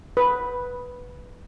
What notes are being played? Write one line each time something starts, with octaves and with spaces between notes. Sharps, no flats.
B4